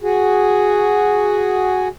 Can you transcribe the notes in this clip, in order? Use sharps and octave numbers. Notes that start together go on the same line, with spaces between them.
F#4 G#4